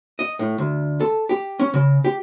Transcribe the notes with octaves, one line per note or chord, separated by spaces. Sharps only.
D#5
A2
D2
A4
G4
C#4
C#3
G4